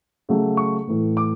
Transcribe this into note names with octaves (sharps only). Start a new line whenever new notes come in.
C#3 F#3 A3
C#6
A2 E3 A3
D6